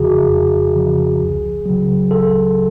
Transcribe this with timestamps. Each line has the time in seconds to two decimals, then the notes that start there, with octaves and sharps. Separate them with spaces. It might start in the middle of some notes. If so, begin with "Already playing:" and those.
Already playing: F2 C#3 F3 F#4 G#4
0.29 F2
0.75 C#3 F3
1.20 C#2
1.66 C#3 F#3
2.11 C#2 A4